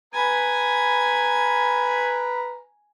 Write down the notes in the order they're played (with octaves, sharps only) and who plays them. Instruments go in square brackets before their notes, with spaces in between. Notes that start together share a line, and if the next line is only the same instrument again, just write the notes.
[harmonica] B4 A#5 B5 [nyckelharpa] G#5